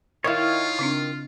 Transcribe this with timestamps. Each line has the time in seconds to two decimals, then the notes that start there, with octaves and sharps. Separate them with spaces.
0.24 D#3 E4 F4 C#5 F5
0.79 C#3 C4 D4